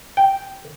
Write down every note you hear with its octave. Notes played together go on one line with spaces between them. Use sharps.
G5